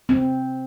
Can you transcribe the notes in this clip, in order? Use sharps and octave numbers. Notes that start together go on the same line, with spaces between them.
C4